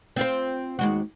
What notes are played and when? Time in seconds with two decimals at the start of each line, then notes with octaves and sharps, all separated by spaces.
0.16 C4 F4 C5
0.79 D#2 G#3 F#4